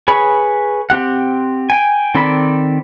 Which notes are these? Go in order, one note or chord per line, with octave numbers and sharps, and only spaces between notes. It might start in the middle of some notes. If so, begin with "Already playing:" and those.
G#4 B4 C#5 B5
C4 G4 F#5
G5 G#5
D#3 C4 A4 D5 B5